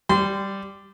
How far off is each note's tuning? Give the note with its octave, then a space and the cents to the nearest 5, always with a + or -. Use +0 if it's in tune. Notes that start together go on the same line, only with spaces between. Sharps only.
G3 +0 C6 -25